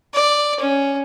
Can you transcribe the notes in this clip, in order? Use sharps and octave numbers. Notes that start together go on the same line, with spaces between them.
D5
C#4